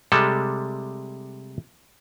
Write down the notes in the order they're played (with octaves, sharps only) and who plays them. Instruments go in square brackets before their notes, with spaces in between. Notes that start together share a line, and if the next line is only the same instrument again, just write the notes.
[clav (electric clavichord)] C3 G3 G#3 A4